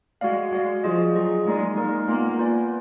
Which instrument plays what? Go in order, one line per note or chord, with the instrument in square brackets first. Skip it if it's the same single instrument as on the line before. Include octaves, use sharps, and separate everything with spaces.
[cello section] G#3 [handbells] F#4 D5 F5
[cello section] G#3 [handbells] F#4 D5 F5
[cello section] F3 [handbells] F4 G#4 D#5
[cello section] F#3 [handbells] F4 G#4 D#5
[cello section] G#3 [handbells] A#3 D#4 A#4 D5
[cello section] G#3 [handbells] A#3 D#4 A#4 D5
[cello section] A#3 [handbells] B3 F4 B4 D5 G#5
[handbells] B3 F4 B4 D5 G#5